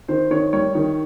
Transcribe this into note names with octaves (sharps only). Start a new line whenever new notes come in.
D#3 C5
D#3 C#5
G3 C#5
D#3